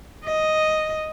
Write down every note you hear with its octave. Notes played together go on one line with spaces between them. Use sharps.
D#5